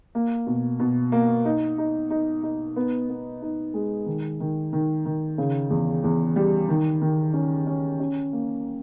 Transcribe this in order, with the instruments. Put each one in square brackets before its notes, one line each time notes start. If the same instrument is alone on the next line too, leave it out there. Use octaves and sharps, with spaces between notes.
[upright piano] A#3
B2
B2
A#3
D#4
D#4
D#4
D#4
B3
B3
D#4
G#3
D#3
D#3
D#3
D#3
C#3
E2
E2
G3
D#3
D#3
C#4
C#4
C#4
A#3